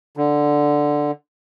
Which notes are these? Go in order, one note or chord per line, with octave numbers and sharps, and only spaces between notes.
D3